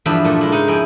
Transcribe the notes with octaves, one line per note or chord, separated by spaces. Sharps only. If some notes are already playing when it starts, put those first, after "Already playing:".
E2 G2 F3 D4 E5 B5
A#2 A3
G#3 E4
G#2 C#3 D#4
F2 E4 G5 G#5